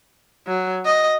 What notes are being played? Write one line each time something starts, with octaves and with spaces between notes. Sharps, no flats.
F#3
D#5